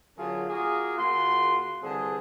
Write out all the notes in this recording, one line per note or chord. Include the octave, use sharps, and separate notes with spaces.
D3 F#3 C#4 F4 G#4 A#4
A#3 F4 F#4 G#4
C#3 A#3 F4 F#4 C6
D3 E3 G3 C4 G#4